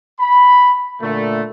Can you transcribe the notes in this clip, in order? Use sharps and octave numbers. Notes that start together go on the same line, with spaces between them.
B5
A#2 D3 A3